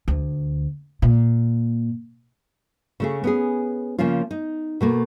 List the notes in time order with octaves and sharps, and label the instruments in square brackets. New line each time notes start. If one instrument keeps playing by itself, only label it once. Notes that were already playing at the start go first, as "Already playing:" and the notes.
[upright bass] D2
A#2
[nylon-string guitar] C#3 A3 G#4
B3 C#4 G#4
C#3 F3 A#3 C#4 F4
D#4
B2 A3 A#3